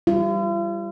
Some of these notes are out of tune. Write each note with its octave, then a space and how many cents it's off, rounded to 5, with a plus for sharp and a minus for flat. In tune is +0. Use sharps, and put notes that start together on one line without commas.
G3 +0 F4 -45